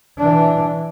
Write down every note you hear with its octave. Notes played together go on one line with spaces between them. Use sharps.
E3 D4